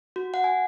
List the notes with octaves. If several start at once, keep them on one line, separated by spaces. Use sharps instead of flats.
F#4
F#5
G#5